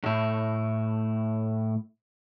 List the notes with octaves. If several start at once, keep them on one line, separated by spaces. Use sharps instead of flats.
A2 E4